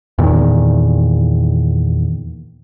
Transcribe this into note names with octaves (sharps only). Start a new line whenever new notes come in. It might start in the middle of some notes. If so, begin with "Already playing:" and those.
E2 A#2 D#3